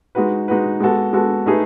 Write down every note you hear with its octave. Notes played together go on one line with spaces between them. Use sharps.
G#3 D#4 F#4 B4
G#3 D#4 F#4 B4
G#3 B3 F#4 A4
G#3 B3 F#4 A4
A3 D#4 G#4 B4